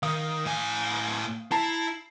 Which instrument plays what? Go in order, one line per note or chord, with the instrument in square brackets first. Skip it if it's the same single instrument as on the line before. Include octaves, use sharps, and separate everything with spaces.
[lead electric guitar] D#3 [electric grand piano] F5 D#6
[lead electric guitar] A2 G#5
[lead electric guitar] E4 [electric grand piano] A5 A#5 C7